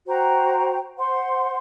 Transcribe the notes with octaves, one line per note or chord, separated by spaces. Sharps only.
F#4 C5 G5 A#5
C5 F#5 C6